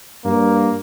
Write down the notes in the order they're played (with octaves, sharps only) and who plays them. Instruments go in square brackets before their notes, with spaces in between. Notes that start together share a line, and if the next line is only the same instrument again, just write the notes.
[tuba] G2 [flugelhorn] A#3